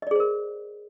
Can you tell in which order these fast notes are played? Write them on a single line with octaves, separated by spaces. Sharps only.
D#5 D5 G#4 C5 A#4